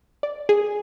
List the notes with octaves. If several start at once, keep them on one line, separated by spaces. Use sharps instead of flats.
D5
G#4